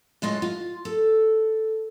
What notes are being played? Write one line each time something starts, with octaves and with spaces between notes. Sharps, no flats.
A2 G#3 F4 D#5
F4
A4